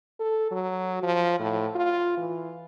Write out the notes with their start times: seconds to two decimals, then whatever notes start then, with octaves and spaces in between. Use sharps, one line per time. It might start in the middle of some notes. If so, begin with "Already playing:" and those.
0.20 A4
0.51 F#3
1.03 F3
1.40 A2
1.76 F4
2.17 E3